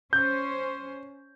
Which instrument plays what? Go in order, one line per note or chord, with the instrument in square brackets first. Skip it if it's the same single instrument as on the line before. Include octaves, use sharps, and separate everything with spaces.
[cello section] C#4 C5 [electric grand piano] G6